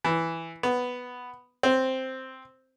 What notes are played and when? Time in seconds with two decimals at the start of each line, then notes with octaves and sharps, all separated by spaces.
0.04 E3
0.63 B3
1.63 C4